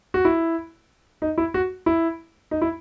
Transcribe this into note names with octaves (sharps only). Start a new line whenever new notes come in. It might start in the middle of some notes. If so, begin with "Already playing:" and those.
F#4
E4
D#4
E4
F#4
E4
D#4
E4